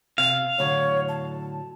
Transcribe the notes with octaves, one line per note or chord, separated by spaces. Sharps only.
C3 F5
A2 D3 F#3 C#5
A5